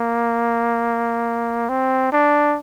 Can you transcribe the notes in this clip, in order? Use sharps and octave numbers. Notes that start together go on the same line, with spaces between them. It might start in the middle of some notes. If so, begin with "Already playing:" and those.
Already playing: A#3
C4
D4